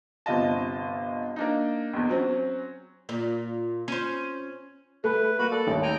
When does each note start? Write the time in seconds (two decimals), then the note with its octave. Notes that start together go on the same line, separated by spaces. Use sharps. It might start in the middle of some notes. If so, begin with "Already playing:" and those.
0.26 G1 C3 F4 D#5 A5
1.36 A#3 D4 D#4
1.93 B1 E2
2.09 F#3 C4 C#4
3.09 A#2
3.88 C#4 C5
5.04 A3 A4 B4 B5
5.39 A#3 F#4 B4 B5
5.51 A4 D5
5.66 A1 D#2 G#2
5.83 G5 G#5 A#5